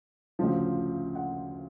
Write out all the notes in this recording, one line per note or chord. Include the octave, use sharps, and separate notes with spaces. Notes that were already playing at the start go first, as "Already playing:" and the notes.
D2 C#3 F3
F#5